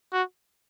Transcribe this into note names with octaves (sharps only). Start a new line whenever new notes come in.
F#4